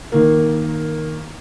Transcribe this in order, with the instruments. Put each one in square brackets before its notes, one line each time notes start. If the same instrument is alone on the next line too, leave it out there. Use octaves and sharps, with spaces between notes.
[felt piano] D#3 A#3